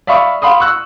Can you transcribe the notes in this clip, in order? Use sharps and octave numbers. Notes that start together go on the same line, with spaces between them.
D5 E5 F5 B5 C#6 D#6
F5 F#5 B5 C6 D#6
C#6 E6 F#6